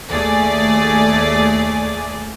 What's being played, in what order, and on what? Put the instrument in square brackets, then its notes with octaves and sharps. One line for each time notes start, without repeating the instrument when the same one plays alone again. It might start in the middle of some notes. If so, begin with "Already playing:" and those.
[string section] D#2 A3 G#4 D5